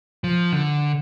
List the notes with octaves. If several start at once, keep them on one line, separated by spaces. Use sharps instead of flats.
F3
D3